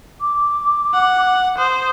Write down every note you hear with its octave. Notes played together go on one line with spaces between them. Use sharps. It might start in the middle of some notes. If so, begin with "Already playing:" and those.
D6
F#5
C5 D#6